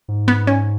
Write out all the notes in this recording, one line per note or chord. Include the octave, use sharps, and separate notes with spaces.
G#2
B3
C#4